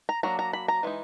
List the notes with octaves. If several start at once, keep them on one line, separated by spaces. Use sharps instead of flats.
A#5
F#3 A#3 D4 A#5
A#5
B5
A#5
E3 G#3 D#4